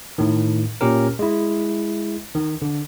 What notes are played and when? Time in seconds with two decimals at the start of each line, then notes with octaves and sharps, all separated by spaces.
0.18 A2 D#3
0.81 A#2 C#4 G4 A#4
1.19 G#3 E4
2.35 D#3
2.62 D3